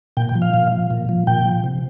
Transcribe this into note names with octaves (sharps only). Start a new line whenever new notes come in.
A#2 G5
G5
F3
F5
A#2
F3
A#2
F3
A#2 G5
F3
C3